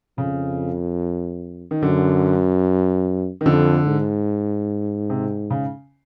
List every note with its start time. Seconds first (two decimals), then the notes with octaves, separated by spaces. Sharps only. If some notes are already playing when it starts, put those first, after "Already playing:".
0.18 F2 C#3
1.71 D#3
1.83 F#2 D3
3.41 D#3
3.45 F2 D3
3.87 G#2
5.10 C3
5.50 C#3